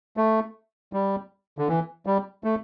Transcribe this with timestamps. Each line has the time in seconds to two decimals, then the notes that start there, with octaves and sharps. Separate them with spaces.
0.17 A3
0.93 G3
1.58 D3
1.68 E3
2.06 G3
2.44 A3